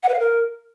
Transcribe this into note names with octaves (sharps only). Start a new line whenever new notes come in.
F#5
B4
F5
A#4